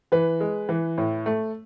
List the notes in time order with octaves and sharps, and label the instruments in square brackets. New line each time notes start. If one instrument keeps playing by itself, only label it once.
[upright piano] E3 B4
G#3
E3
A2
A3